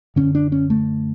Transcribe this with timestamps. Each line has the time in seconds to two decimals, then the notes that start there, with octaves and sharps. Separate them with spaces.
0.16 F#2 D3 C#4
0.35 D4
0.52 C#4
0.70 A3